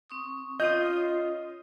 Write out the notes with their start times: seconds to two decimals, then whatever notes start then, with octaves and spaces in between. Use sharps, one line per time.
0.10 C4 C#6 D#6
0.60 C#4 F4 C#5 D#5 D#6 G6